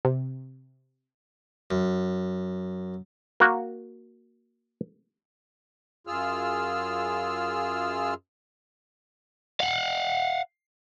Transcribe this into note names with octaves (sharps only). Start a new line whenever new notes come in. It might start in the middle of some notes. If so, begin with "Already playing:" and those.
C3
F#2
A#3 F#4
F#2 F4 G#4 E6 F6
F5 F#5